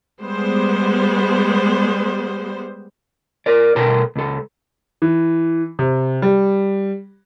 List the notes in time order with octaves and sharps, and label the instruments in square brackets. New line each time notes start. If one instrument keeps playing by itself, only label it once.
[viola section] G3 G#3 B3 C5
[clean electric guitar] A#4 D5
B2 A4 A#4 G5 A5 A#5
C#2 A4
[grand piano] E3
C3
G3